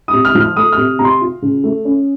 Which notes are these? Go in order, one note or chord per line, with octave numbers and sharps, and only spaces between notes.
C3 D#6
F6
F3
F6
A3 D#6
F6
C3
C3 A#5
C6
F4
C#3
A3
C#4